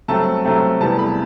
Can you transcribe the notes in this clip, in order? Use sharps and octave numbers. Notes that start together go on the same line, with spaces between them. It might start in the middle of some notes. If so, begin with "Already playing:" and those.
G2 F#3 A3 C4 A5
G2 F#3 A3 C4
E2 C3 E3 G3 B3 A5
B5